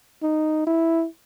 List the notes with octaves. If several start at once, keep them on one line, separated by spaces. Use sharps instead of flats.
D#4
E4